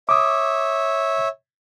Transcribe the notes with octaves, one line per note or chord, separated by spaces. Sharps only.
C#5 E5 D6 D#6